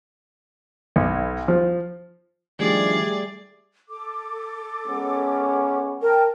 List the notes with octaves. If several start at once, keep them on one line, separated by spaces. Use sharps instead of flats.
B1
F3
D#3 F3 G3 A3 D4 G4 G#4 D5
A4 D6
G#3 B3 C#4
A#4 G5 A5